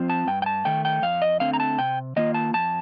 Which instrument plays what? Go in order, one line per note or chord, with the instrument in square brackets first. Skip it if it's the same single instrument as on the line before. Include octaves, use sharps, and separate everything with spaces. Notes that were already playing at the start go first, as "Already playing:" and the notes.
Already playing: [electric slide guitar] F3 C4 F4
A5
G2 G5
G5
A5
D#3 A3 G5
G5
F2 F5
D#5
D3 A3 C4 F5
A#5
A5
C3 G5
D#3 A#3 F4 D#5
A5
F2 A5